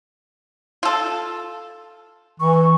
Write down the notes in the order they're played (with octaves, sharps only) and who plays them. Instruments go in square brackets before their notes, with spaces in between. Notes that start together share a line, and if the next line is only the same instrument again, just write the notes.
[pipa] F4 A4
[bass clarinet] E3 [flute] C#6